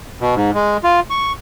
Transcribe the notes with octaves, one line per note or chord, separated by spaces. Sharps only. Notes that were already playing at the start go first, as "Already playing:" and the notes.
B2
G#2
G#3
F4
C#6